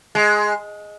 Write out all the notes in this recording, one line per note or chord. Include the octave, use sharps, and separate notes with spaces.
G#3